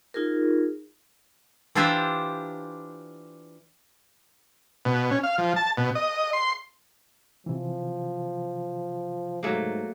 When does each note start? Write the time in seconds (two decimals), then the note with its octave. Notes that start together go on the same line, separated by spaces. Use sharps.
0.14 D#4 F4 G#4 A#4
1.75 E3 D4 F4 G4 C5 E5
4.85 B2
5.11 C#4
5.23 F5
5.38 F3
5.56 A5
5.77 B2
5.95 D#5
6.33 C6
7.46 C3 E3 F3
9.43 G#2 F#3 A3 A#3